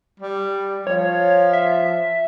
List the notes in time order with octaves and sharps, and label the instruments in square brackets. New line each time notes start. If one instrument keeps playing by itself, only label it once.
[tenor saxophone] G3
[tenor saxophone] F3 [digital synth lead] C#5
[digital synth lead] E5